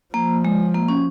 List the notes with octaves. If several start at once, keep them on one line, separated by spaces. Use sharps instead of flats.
F3 A#3
G#3
A#3
C#4